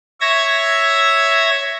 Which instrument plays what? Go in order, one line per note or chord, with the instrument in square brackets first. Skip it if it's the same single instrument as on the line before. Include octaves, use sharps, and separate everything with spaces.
[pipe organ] C#5 E5 G#6 A#6